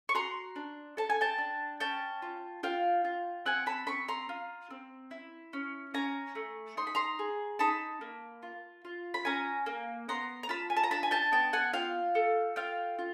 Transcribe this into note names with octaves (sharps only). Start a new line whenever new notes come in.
C#6
F#4 A#5 C6
D4
A4 A5
G#5
G5 A5
D4
C#4 G5 A5
F4
F4 F5 G5
F4
C4 F#5 G#5
A5 B5
C4 B5 C#6
A#5 C6
F4
C4
E4
C#4
C#4 G#5 A#5
A3
D#4 C6
B5
A#5 C6
G#4
D#4 A5 B5
A#3
F4
F4
B5
C#4 G#5 A#5
A#3
B3 A#5 C6
A#5
F4 A5 B5
G#5
A5
A#5
D4 A5 B5
G#5
G5 A5
B3 G5 A5
F#5 G#5
F4 F5 G5
A4
F4 F5 G5
F4